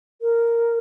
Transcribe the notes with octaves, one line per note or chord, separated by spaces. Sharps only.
A#4